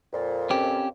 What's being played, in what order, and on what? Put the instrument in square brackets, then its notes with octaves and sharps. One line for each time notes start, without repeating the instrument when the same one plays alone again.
[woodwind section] F2 A#2
[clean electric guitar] C4 C#4 G4